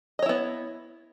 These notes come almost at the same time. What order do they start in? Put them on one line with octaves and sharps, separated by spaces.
D#5 C#5 E4 B3